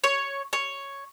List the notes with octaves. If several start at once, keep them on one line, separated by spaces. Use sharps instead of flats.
C#5
C#5